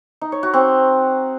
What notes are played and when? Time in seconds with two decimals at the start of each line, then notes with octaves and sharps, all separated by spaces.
0.21 D#4
0.32 C#5
0.43 F#4
0.54 C4